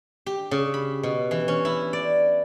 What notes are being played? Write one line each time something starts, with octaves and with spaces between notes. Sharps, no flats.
G4
C#3
B5
B2
E3
C#4
E4
D5